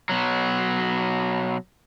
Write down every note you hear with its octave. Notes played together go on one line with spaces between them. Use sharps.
B2 F#3